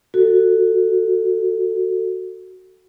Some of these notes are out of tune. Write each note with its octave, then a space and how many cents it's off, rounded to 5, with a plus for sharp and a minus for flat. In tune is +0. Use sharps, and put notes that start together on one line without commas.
F#4 +5 A4 +20